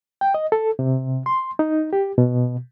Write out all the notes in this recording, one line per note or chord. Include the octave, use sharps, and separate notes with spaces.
G5
D#5
A4
C3
C6
D#4
G4
B2